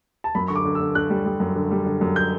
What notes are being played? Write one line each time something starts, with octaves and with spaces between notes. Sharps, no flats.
A5
F#2 B5
D3 C#6
D6
D3
E6
D3
D3 F#6
G3
G3
F#2
D3
G3
D3
F#2
G6